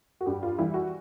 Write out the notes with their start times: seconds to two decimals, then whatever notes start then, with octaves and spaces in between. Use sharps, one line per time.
0.21 F#4
0.26 G2 G4
0.43 F4
0.58 E3 G3 E4
0.74 F#4